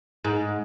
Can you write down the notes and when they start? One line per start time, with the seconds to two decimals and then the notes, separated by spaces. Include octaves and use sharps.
0.25 G#2